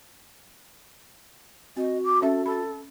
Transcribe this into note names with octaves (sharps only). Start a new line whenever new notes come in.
C4 F#4 D#5
D6
C#4 A4 E5
A4 B5